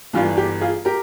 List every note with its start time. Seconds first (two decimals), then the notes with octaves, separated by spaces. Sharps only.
0.13 G1 G2 E3 F4
0.37 G4
0.61 F4 G#4
0.85 G4 A#4